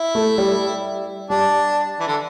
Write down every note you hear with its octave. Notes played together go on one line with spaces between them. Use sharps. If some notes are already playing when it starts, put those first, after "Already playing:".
Already playing: E4
A3
G3
G3 D4
E3
D3